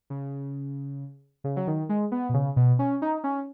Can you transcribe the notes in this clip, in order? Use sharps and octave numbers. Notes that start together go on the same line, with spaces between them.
C#3
C#3
F#3
D#3
G#3
B3
B2
C#3
B2
C#4
D#4
C#4